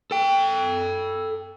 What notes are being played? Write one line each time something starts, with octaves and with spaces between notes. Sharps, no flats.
A4 G5